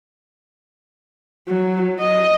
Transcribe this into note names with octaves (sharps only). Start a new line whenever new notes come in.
F#3
D#5